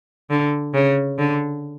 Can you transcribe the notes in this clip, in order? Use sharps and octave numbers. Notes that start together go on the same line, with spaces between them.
D3
C#3
D3